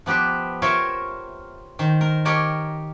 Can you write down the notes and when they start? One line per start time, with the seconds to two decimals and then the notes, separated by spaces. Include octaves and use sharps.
0.06 F3 B3 G4 B4 C5
0.62 F4 A#4 C5 C#5 E5 G5
1.79 D#3 C5
2.01 A#4
2.25 G4 A#4 C#5 D#5 G5 A5